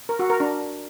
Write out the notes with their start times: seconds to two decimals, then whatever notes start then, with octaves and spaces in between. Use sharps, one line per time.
0.09 A#4
0.19 F#4
0.30 A#4
0.40 D4